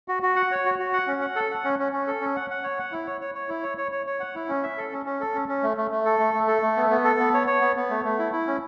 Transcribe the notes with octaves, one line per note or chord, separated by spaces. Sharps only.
F#4
F#4
F#5
C#5
F#4
F#4
F#5
C#4
F#5
A4
F#5
C#4
C#4
C#4
A4
C#4
F#5
F#5
C#5
F#5
E4
C#5
C#5
C#5
E4
C#5
C#5
C#5
C#5
F#5
E4
C#4
E5
A4
C#4
C#4
A4
C#4
C#4
A3
A3
A3
A4
A3
A3
A4
A3
B3
B3
A4
B3
C#5
C#5
B3
B3
A3
A3
E4
E4
C#4